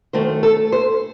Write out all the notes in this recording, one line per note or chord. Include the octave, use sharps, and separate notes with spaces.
F#2 D#3 A3 C5
A4
C5